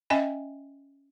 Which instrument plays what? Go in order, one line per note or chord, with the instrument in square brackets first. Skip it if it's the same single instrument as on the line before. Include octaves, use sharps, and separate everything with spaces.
[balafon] C#4 D#5 E5 G5 G#5 B5